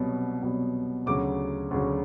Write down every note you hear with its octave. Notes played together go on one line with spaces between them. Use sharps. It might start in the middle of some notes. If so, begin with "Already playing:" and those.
Already playing: C2 B2 F#3 B3
C2 B2 F#3 B3
D2 C#3 F#3 D6
D2 C#3 F#3